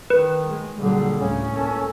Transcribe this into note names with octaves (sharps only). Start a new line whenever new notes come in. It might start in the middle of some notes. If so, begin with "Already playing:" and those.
D#3 B4
G#3
A#2 D3 F#3 G3 G#4
D2 A2 C#3 C#4
C#2 A#3 A4